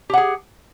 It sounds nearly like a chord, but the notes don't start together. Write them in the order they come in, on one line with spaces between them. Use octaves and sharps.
G4 F#5 G#4